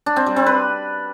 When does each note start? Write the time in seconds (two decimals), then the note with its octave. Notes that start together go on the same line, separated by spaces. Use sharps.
0.06 D4
0.16 C4
0.26 G3
0.36 C4
0.46 B4